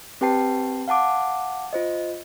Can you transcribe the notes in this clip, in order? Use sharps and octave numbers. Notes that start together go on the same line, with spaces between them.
C4 G4 B4 G5 A5 C7
F5 F#5 A5 D6
F4 C5 D#5